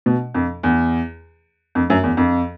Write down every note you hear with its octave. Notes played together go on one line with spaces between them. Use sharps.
B2
F2
E2
F2
F#2
E2
F2